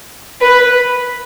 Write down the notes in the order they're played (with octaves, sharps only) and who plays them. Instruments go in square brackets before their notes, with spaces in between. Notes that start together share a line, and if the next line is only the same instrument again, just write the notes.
[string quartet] B4